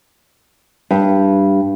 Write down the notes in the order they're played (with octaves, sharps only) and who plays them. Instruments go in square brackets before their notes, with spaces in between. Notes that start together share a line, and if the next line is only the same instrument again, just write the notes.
[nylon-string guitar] G2